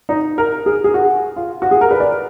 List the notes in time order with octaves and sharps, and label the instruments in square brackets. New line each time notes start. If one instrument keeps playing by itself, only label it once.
[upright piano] D#4
A#4
G#4
G#4
F#4
F4
F#4
G#4
A#4
B4
D5